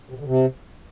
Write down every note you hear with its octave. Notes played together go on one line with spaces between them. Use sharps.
C3
B2
D3
C3